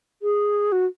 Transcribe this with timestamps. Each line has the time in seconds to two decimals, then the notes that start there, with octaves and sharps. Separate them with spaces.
0.22 G#4
0.72 F#4